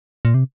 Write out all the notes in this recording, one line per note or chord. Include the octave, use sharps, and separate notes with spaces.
A#2
C3